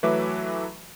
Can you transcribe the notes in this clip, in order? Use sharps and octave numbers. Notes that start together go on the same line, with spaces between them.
E3 F#3 A3 B4 E5 D6